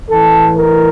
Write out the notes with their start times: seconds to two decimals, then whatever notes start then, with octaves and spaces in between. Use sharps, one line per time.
0.10 A2 E3 A4
0.57 A#4